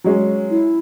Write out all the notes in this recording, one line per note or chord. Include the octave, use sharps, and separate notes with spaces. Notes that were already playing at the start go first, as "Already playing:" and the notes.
F#3 G#3 C#4
E4